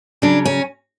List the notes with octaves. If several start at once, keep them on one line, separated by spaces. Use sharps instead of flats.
C#3 F#3 D4
C#4